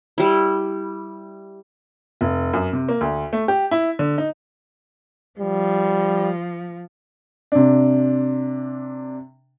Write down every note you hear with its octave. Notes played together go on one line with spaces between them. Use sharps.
G3 E4
F1
F#2
C3
A#3
D2
A3
G4
E4
D3
D#4
F3 G3
C3 D4